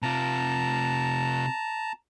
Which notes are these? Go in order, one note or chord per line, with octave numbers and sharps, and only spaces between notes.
C3 F4 A5 A#5